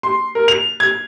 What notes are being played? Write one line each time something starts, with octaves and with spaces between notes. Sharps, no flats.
C6
A#4
F7
G#6